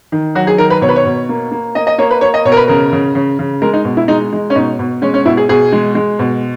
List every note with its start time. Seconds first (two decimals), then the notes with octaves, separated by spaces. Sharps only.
0.12 D#3
0.35 F#3 F#4
0.47 G#4
0.58 D#3 A#4
0.70 B4
0.81 B2 C#5
0.89 B4
0.96 C#5
1.05 B2
1.29 A#3
1.52 A#3
1.75 A#3 D#5
1.87 D#5
1.98 A#3 C#5
2.11 B4
2.21 A#3 C#5
2.34 D#5
2.45 B2 C#5
2.52 A#4
2.57 B4
2.68 C#3 A#4
2.93 C#3
3.15 C#3
3.39 C#3
3.62 G#3 A#4
3.73 D#4
3.85 B2
3.97 E4
4.08 G#3 D#4
4.33 G#3
4.50 C#4
4.56 B2 D#4
4.79 B2
5.02 G#3 C#4
5.14 C#4
5.26 B2 E4
5.37 G#4
5.49 B2 G#4
5.73 G#3
5.95 G#3
6.19 B2